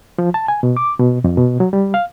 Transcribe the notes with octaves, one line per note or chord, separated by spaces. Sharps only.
F3
A5
G#5
B2
D6
B2
F2
B2
F#3
G3
F5